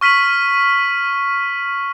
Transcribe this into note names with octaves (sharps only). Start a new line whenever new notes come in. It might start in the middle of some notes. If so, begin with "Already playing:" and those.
C#6 F6 B6 D#7 F#7